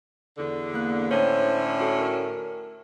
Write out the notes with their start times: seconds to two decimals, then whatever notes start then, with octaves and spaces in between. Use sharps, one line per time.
0.37 E2 D3
0.74 A#3 F#6
1.11 A2 D3 C#4 C5 C#5
1.80 F#4 A4
1.99 A#4